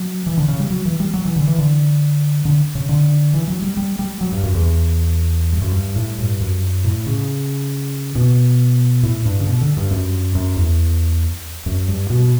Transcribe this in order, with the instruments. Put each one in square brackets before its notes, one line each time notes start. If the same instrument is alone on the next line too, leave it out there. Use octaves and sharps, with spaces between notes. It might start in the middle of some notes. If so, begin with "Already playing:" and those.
Already playing: [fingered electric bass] F#3
E3
D3
C#3
G3
F#3
E3
G3
F#3
E3
D3
E3
D3
D3
C#3
D3
E3
F#3
G3
G3
G3
F#3
G2
F#2
E2
G2
F#2
G2
A2
G2
F#2
A2
C#3
B2
A2
G2
C#3
B2
D3
G2
F#2
F#2
E2
F#2
G2
B2